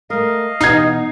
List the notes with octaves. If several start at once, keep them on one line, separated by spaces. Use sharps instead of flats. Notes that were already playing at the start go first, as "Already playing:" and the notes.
A3 A#4 D#5 F5
B2 E3 D#4 G#6 C7